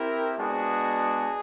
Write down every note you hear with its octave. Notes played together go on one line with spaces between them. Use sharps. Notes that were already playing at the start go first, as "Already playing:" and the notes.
Already playing: C4 E4 G4 A#4
G#3 B3 D4 F#4 G#4